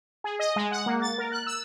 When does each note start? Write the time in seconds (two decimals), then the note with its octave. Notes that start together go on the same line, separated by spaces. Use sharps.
0.24 G#4
0.39 D#5
0.56 G#3
0.71 F#5
0.86 A#3
1.02 A6
1.18 A#4
1.32 F#6
1.47 E6